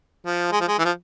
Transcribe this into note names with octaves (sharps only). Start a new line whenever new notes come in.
F3
G#3
F3
G#3
E3
F3